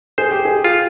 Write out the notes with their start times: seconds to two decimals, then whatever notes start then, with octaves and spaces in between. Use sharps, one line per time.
0.18 G#4 C5
0.31 G4
0.45 G#4
0.64 F4